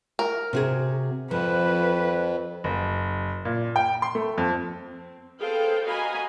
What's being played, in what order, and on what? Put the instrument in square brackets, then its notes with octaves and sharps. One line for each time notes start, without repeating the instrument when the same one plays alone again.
[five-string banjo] A#4
[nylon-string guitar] C3 F#4 G#4
[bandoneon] F2 [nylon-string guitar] F3 [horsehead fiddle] B4
[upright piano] F#1
A#2
G5
C6
A3
F2
[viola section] C4
G#4 A4 B4 C5 F5 G5
F#4 D#5 F5 G#5 A#5 B5